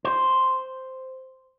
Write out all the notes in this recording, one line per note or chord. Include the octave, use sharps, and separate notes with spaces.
C5